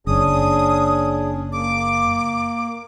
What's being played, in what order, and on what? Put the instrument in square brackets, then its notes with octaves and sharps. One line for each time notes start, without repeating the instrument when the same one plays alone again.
[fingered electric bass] F#1 [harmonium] C#4 D4 G#4 [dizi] D#6
[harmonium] A#3 [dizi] D6